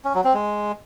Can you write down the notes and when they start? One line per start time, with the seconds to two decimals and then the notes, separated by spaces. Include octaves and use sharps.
0.05 C#4
0.14 F#3
0.24 C4
0.34 G#3